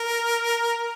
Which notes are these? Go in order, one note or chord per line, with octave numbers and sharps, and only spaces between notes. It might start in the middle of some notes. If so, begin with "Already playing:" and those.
Already playing: A#4